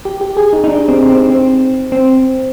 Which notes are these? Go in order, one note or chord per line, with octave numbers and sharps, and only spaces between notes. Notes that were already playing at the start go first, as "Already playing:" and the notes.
G4
G4
G#4
D#4
D#4
D4
C4
C4
C4
C4